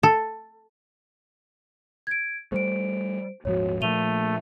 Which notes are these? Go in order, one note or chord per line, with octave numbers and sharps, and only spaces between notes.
A4
G#6 D7
G3 A3 C5 D7
D#1 G#2 F3 F#4 C#5
A#2 F3 A3 D#7 F7 G7